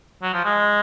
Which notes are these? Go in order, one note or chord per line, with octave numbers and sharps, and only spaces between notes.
F#3
F3
G#3